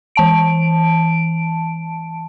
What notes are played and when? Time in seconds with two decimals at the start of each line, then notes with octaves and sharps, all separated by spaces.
0.16 E3 A5 D7